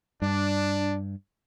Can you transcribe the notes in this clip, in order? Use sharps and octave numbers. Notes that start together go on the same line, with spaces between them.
G2 D4